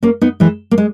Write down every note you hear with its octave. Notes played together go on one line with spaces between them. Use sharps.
A#3 C#4
B3 D#4
E3 G#3
A#3
G#3